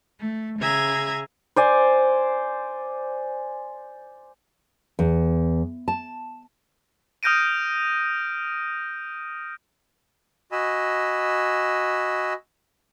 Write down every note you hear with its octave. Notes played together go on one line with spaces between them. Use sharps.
A3
C#3 G#4 E5 A#5 G#6
C5 D5 G#5
E2
A5
D#6 F6 G6 A#6 D7 D#7
F#4 D#5 G#5 B5 E6